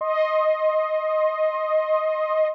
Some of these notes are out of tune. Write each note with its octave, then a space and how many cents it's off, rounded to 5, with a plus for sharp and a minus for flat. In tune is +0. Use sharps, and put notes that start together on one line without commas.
D#5 +0 C6 +20